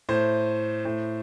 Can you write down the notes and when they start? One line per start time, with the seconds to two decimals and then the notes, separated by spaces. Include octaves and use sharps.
0.09 A2 C5
0.85 A2